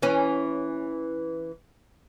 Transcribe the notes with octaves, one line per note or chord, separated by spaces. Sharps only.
E3 C#4